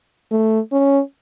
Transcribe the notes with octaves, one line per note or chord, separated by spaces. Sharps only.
A3
C#4